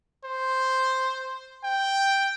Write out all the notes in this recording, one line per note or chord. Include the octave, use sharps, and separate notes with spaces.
C5
G5